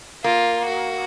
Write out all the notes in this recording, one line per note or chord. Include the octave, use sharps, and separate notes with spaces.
A#3 F4
F#4